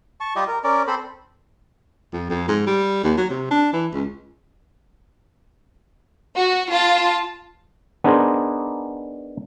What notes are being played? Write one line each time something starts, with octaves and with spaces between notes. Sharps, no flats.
A5 C#6
G3 F4 G4 D#5
A#4
C#4 A#4 D5
C4 A4 C5 B5
F2
F2
G#2
G3
D#2
F#3
C3
D4
E3
C#2
F#4
F4 A5
B3 D4 D#4 G#4 A#4 C5